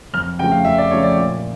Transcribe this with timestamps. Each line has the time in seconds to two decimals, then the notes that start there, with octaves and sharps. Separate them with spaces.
0.13 F2 F6
0.39 C#3 F3 A3 G5
0.52 F5
0.65 F2 E5
0.78 D5
0.91 C#3 F3 A3 C#5
1.03 D5
1.17 A#2